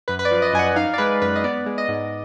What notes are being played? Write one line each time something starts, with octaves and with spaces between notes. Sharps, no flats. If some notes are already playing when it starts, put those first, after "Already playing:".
F#2 B4
B4
D5
F3
D#5
F#2 G#5
F#5
D#4 F5
D5
G#3 B4
F#2 B4
D#5
B3 D5
G#3
D#5
G#2